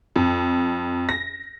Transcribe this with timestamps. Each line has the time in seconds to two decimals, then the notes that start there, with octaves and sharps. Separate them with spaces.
0.16 F2
1.09 A#6